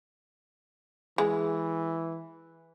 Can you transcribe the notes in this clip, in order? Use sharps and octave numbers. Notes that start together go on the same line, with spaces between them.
E3 G#3